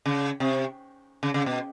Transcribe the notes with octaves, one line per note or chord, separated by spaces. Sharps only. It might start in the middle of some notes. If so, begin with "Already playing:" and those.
C#3
C3
C#3
C#3
B2